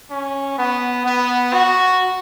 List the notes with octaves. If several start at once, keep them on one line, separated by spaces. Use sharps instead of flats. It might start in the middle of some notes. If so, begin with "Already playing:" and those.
C#4
B3
B3
F#4